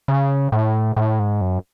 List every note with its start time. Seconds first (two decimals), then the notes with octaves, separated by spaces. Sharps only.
0.08 C#3
0.52 A2
0.96 A2
1.19 G#2
1.41 F#2